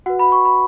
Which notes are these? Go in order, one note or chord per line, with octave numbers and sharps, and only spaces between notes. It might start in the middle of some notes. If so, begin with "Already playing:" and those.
F#4 B4 F#5
B5
C#6
B5